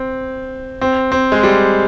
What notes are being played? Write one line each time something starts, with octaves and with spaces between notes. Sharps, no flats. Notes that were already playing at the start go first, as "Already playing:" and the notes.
Already playing: C4
C4
C4
G#3
G3